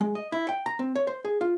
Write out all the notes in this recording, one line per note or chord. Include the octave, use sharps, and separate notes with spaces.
G#3
D#5
E4
G5
A#5
C4
C#5
C5
G#4
F4